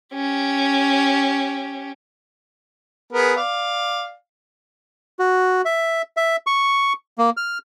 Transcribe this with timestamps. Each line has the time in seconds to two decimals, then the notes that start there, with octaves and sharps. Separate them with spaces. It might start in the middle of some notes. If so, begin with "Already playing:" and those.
0.14 C#4 G4
3.13 B3 G#4 A#4
3.37 D5 F5
5.19 F#4
5.65 E5
6.17 E5
6.47 C#6
7.18 A#3
7.37 F6